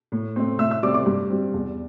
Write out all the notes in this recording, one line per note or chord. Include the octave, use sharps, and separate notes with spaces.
A2
A3 C4
A2 E5 E6
E5 E6
G3 C4 D5 D6
D5 D6
G2
G3 C4
E2